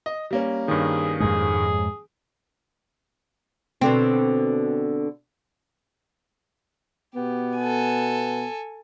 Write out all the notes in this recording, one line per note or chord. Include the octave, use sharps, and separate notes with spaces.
D#5
G3 A#3 C#4
G2 D#3 G#4
F2 G#2 G#3 G#4
B2 D3 C4
B2 B3 G4
A4 G#5